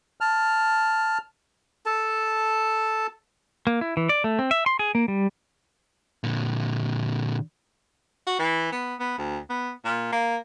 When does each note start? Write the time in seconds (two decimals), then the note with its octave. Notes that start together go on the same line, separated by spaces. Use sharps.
0.21 A5 F6
1.86 A4 A5
3.67 A#3
3.81 E4
3.97 E3
4.09 D5
4.24 A3
4.39 C4
4.51 E5
4.66 C6
4.79 G#4
4.95 A#3
5.08 G3
6.24 A#2 D3
8.27 F#4
8.39 E3
8.72 B3
9.00 B3
9.18 D2
9.49 B3
9.85 A#2
10.13 A#3